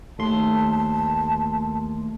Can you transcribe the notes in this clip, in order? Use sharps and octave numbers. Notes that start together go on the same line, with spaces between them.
D#2 A3 A5 C6